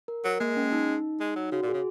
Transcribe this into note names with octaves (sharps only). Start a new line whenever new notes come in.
A#4
F#3 A#4
G#3 A#3
C#4
D#4
G#3
F#3
C#3 F#4
A#2
G#4
C#3